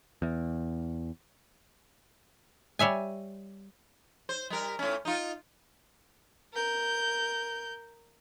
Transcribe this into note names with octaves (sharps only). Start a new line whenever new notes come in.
E2
G3 C#5 E5 G#5
C5
G3 A#4
A2 C#4
D#4 F4
A#4 G6